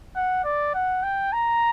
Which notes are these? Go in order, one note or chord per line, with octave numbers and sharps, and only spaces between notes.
F#5
D5
F#5
G5
A#5